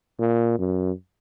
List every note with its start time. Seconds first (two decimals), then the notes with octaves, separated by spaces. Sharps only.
0.20 A#2
0.59 F#2